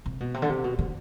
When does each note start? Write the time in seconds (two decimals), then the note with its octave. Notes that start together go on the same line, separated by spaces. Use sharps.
0.06 C3
0.20 B2
0.34 C3
0.42 D3
0.49 C3
0.64 B2
0.79 D3